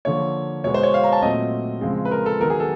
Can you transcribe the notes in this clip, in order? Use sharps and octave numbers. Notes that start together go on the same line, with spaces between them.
D3 F3 A#3 C#5
B2 G#3 B3 C#5
C5
C#5
F5
A#5
A5
A#2 F#3 A3 C4 D#5
C#3 F3 G#3 C4
B4
A#4
A4
D#3 F#3 B3 A#4
G#4
A4